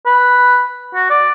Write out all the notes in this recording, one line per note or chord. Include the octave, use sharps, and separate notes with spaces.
B4
F#4
D5